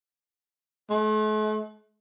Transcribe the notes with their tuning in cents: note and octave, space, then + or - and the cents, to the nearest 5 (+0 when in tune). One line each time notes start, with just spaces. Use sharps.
A3 -45